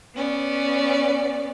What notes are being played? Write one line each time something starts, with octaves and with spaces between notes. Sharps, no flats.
B3 C#4 D5